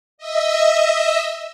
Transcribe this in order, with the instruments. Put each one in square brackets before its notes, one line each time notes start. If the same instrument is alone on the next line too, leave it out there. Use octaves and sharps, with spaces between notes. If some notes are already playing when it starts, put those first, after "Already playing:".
[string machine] D#5 E5 E6